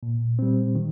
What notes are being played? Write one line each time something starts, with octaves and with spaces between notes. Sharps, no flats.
A#2
G3 C4
D#3